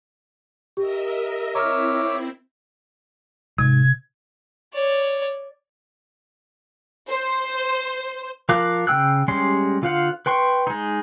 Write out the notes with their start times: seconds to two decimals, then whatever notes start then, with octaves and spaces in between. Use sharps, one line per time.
0.77 G4 A#4 D#5 E5
1.55 C4 E4 C#5 E5 A#5 D6 F6
3.58 G#2 C3 G#6
4.74 C#5 D5
7.09 C5
8.49 F3 A#4 F5 D6 F#6
8.87 C#3 F4 G5 E6 F#6
9.28 G3 G#3 C#4 G4 C6
9.82 D3 F4 C5 F5 F#5
10.26 B4 G5 C6 C#6
10.67 G#3 D#4